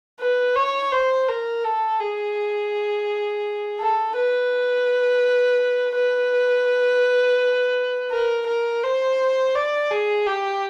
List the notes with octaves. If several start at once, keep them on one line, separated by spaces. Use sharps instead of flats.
B4
C#5
C5
A#4
A4
G#4
A4
B4
B4
A#4
A#4
C5
D5
G#4
G4